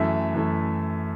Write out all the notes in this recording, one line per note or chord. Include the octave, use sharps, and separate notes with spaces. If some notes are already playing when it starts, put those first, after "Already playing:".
Already playing: F#2 E3 A3 E5
F#2 E3 A3